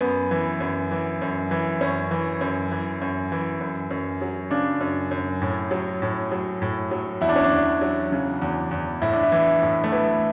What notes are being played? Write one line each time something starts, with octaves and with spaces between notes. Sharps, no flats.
F#2 B3
E3
F#2
E3
F#2
E3
F#2 C#4
E3
F#2
E3
F#2
E3
F#2
F#2
F#3
C#3 D4
F#2
F#2
A2
F#3
A2
F#3
A2
F#3
E2 E4
D4
C#4
D4
E2
F#3
C#3
E2
E2
A2 E4
D4
E4
E3
A2
A3
E3 B3